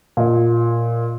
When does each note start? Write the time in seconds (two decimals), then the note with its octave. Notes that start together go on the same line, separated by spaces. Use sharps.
0.17 A#2 D#5